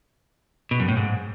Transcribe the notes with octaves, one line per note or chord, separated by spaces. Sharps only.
B2
F#2
A2
G#2